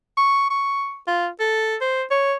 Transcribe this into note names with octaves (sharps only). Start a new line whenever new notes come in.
C#6
C#6
F4
A4
C5
C#5